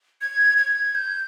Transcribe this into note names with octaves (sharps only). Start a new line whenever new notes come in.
G#6
G#6
G6